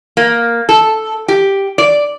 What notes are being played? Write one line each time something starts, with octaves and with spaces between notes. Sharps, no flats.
A#3
A4
G4
D5